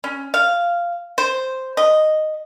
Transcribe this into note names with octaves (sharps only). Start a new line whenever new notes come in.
C#4
F5
C5
D#5